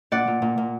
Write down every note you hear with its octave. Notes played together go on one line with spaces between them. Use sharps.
A#2 D5 F#5
A#2
A#2
A#2